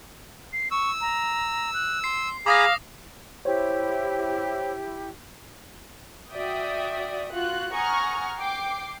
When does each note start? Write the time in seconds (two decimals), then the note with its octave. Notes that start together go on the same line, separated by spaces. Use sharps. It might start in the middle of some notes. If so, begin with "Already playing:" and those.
0.53 C7
0.71 C#6 E6
1.01 A#5
1.74 F#6
2.04 C6 C7
2.46 G#4 F5 A#5 B5 D6 D#6 A#6
3.45 E4 G4 C5 C#5
6.32 F#4 D5 E5 G5 D#6
7.32 F4 F#4 F#6
7.72 F#5 G#5 A#5 C#6 D#6 F6
8.37 G5 D6 C7